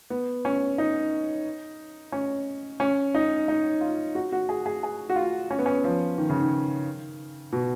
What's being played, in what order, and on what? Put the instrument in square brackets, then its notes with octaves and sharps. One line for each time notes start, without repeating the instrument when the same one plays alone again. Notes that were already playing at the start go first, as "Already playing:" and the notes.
[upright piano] B3
C#4
D#4
C#4
C#4
D#4
D#4
F4
F#4
F#4
G#4
G#4
G#4
F#4
F4
C#4
B3
C#4
F3
D#3
C#3
D#3
B2